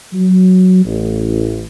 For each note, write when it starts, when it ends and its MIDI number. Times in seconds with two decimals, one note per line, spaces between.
0.13 0.85 54
0.85 1.62 33